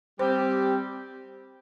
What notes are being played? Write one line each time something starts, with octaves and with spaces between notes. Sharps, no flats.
G3 C4 G4 C5